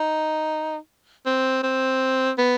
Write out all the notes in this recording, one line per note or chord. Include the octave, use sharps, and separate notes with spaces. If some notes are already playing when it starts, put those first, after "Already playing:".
Already playing: D#4
C4
C4
B3